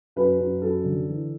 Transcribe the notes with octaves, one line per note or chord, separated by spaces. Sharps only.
F#2 B4
F#2
F#2 A4
D3
E3